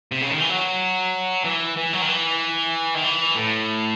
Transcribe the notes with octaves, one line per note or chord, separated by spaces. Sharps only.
C3
C#3
D#3
E3
F#3
E3
E3
F#3
D#3
E3
D#3
E3
A2